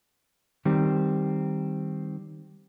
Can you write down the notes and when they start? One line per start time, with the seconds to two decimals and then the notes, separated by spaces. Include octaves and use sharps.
0.65 D#3 G3 C4